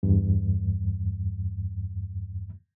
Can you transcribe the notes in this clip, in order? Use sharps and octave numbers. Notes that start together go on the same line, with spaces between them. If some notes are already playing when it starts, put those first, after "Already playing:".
E2 G2